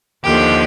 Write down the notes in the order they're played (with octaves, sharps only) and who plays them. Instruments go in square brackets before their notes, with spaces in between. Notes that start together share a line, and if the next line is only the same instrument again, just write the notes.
[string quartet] D#2 D3 F3 G4